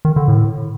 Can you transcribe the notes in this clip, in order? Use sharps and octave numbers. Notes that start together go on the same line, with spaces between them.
D#3
D3
A2